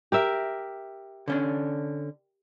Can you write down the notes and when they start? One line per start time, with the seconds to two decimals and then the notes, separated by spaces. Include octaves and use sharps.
0.12 G4 A#4 E5
1.28 D3 C#4 D4